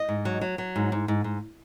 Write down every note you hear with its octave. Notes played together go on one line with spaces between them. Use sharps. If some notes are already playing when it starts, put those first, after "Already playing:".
Already playing: D#5
G#2
F#3
F#3
F#3
G#2
G#2
G#2
G#2